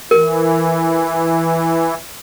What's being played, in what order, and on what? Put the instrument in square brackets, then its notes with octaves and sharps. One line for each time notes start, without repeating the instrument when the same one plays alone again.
[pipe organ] E3 [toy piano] A#4